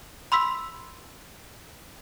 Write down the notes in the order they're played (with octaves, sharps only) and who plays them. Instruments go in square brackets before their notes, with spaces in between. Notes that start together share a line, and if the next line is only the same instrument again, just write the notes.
[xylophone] B5 C6 E6 B6